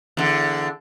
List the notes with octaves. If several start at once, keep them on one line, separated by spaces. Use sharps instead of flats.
E2 D3